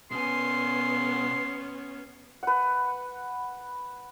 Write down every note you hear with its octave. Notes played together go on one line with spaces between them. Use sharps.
B2 B3 C#4 G#5 C6
B4 F#5